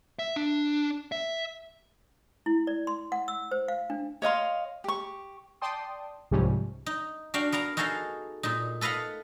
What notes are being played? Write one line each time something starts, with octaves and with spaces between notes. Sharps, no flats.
E5
D4
E5
E4
D5
C6
F#5
E6
C5
F5
D4
C#5 D#5 F5 C6
G4 C#6
D5 G5 A5 C6 D#6
C2 G#2 C3 F3 G3 C#4
D#4
D4 F#4 F5 G5
B3 A#4 F5 A#5
D#4 F#4 G#4 A4 D#5 F5
A#2 D#4
A4 B4 D#5 F5 F#5